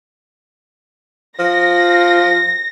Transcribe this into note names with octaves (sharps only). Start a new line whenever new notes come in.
F3 A#6